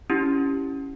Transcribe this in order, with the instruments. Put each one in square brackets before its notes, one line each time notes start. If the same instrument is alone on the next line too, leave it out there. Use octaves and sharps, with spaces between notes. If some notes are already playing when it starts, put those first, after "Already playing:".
[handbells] C#4 E4 G4